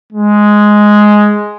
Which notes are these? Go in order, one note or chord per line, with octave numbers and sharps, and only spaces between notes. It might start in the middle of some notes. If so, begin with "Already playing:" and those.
G#3